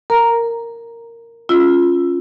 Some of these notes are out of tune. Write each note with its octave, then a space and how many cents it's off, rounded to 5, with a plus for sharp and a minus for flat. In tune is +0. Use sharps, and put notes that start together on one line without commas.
A#4 -10 A#5 +0
C#4 +0 F4 +0 E6 +10